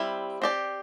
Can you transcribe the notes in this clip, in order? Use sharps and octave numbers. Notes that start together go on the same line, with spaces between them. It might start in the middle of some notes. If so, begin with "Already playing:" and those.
Already playing: G3 C4 E4
C4 G4 D5